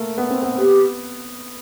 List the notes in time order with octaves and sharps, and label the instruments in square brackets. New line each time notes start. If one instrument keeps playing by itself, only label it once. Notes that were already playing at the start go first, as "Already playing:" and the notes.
Already playing: [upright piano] A3 A#3
B3
C4
B3
[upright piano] B3 [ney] G4